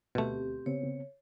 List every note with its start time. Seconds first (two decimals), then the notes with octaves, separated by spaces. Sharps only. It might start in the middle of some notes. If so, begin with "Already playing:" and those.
0.15 D2 B2 A3 C4 G4
0.66 C#3 B3 C4 C#5